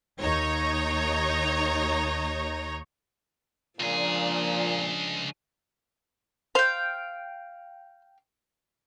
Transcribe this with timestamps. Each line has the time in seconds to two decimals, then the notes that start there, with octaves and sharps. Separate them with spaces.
0.19 D#2 D#4 C#5 A#5
3.80 C#2 A#2 F3 D4 G#4
6.55 C5 F5 G5